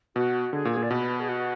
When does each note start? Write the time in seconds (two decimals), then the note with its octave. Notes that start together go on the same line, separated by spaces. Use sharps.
0.15 B2 F#4
0.53 D3 G#4
0.65 A#2
0.71 G#4
0.77 A#2
0.82 D5
0.90 B2 B4
1.20 G#4
1.28 F#4